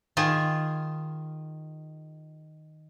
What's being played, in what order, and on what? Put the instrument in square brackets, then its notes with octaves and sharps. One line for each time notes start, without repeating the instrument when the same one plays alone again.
[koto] D#3 F4 G#4